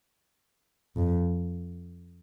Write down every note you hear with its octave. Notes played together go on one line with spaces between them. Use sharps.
F2